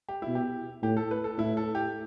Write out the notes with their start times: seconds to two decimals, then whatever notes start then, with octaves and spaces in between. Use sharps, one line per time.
0.09 G4
0.22 E4
0.27 B2
0.35 G4
0.83 A2 G4
0.97 A4
1.11 B4
1.24 A4
1.38 A2 E4
1.57 A4
1.75 G4